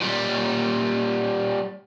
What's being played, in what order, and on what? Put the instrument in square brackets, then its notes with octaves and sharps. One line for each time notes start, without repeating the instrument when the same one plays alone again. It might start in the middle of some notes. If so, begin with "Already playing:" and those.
[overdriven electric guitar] A#2 G3